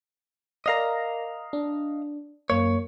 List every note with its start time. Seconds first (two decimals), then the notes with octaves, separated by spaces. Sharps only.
0.66 A#4 D5 D#5 F5 A#5
1.53 D4
2.50 F#2 A#3 C#5